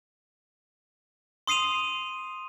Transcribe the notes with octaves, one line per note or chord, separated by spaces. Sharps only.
C6 D#6 C7 D#7 F7